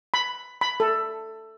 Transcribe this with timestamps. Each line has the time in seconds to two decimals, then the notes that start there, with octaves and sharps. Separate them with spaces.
0.14 B5
0.61 B5
0.80 A4